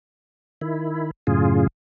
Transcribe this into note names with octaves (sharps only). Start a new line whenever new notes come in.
D#3 E4
F#2 A2 C#3 F4 G#4